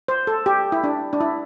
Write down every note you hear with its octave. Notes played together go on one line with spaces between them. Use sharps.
C5
A4
G4
E4
D4
D4
E4